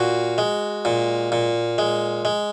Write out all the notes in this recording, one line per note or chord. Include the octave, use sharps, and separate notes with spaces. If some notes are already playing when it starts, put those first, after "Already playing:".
Already playing: A#2 F#4
G#3
A#2
A#2
G#3
G#3